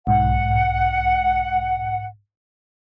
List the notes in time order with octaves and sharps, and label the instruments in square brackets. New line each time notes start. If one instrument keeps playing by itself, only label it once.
[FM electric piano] B1 G#2 [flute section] F#5